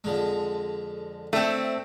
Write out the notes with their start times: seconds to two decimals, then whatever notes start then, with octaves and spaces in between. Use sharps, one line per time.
0.04 F2 D3 G#3
1.33 A3 C4 D4 E4 C5